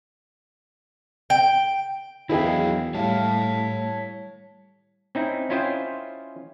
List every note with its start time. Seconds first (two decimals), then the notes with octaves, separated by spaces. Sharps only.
1.30 G5
2.29 E2 D#3 F#3 E4 G#4 D#5 F5 G5
2.95 A2 G3 C#5 E5 F5 A5
5.15 C4 C#4 D#4 E4
5.50 C#4 E4 F4 C5 D#5 G5